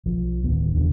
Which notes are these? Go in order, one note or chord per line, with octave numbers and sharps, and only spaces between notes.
B1 F3
D1 D#3 B3
F1 E2 B2 D3